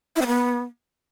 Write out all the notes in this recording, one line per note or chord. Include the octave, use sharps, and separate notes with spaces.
E4
C4
B3